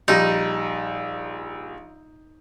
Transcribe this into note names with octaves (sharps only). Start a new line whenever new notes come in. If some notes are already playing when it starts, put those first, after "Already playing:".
A#1 G3 D#4 A#6